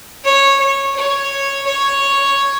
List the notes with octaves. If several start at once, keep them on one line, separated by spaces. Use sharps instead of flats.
C#5
C#5
C#5
C#5